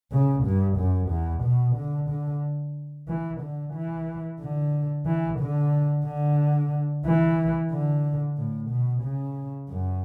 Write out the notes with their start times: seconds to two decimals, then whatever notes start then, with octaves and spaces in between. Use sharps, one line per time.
0.12 C#3
0.44 G2
0.78 F#2
1.10 E2
1.43 B2
1.76 D3
2.10 D3
3.08 E3
3.41 D3
3.74 E3
4.40 D3
5.06 E3
5.39 D3
6.05 D3
7.05 E3
7.71 D3
8.37 A2
8.70 B2
9.03 C#3
9.69 F#2